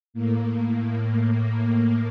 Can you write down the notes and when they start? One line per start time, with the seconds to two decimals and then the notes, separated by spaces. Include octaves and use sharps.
0.14 A2 A#3
1.40 A2 A#3